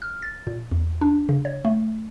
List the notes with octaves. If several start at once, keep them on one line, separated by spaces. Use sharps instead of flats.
F6
A6
A#2
E2
D4
C#3
C#5
A3